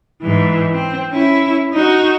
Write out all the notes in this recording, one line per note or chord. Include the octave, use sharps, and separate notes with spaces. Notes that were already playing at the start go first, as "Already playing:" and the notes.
G#2 E3
C4
C#4 E4
D#4 F#4